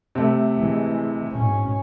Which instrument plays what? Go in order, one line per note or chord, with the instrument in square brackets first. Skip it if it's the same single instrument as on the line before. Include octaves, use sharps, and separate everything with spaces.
[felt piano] C3 A3
[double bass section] E3 G#3
G#2 B2 C#4